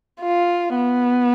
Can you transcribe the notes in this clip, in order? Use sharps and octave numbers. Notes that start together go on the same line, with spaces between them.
F4
B3